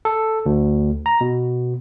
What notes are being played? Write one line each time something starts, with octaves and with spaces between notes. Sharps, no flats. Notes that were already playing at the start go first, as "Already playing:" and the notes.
A4
D2
A#5
B2